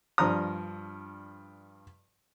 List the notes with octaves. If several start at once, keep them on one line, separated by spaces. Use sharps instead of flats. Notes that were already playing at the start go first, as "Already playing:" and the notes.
G2 F3 D4 A#5 D#6